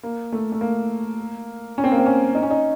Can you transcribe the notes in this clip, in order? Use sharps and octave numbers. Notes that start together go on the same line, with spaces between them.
A#3
A3
A3
A#3
C#4
C4
A#3
C4
C#4
D#4
C#4
D#4